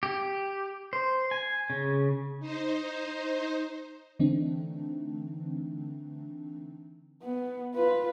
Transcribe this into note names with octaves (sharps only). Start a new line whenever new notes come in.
G4
C5
G#5
C#3
D#4 C5
D3 E3 A3 C4 D4 D#4
B3
F4 B4